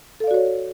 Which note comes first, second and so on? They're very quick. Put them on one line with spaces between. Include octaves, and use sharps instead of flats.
A4 F5 D5 F#4 C#5